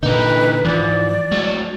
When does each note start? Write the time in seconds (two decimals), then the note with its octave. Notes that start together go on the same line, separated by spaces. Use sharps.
0.03 A#2 D3 E3 D#4 B4
0.65 F2 G#2 E3 F3 D5
1.31 D2 F#3 G#3